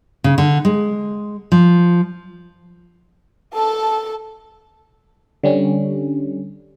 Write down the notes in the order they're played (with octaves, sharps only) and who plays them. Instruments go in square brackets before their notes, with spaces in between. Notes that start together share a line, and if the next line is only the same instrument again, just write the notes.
[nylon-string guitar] C#3
D3
G#3
F3
[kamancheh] A4 A5
[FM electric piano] D3 G3 C#4